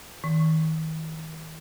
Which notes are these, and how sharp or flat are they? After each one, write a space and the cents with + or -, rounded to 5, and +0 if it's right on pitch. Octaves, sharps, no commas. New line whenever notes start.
D#3 +35